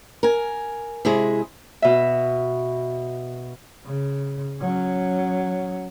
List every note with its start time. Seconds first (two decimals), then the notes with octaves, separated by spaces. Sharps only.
0.23 A#4 G#5
1.05 C3 G#3 E4 G#4
1.82 B2 E5
3.85 C#3
4.61 F#3 C#4